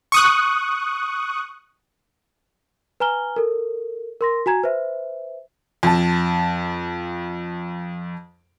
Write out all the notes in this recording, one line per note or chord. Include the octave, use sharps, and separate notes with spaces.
C#6 D#6 F#6
B4 G#5 A#5 F6 G7
A4 A#4
A#4 C6 A#6
F#4 G#5 A#5 G#6
B4 C5 E5
F2 A5